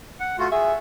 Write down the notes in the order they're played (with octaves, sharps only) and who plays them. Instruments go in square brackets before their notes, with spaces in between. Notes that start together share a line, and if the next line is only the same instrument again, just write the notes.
[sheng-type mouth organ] F#5
A3 F4 F#4
[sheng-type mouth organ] G#4 [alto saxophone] E5